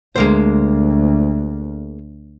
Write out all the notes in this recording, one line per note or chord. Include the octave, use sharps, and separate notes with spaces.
D2 G#3 A#3 C5